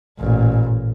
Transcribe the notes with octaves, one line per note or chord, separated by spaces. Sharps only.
A1 A#2